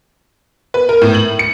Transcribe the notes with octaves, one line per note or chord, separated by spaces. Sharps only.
B4
A#4
A2
F#7
C#7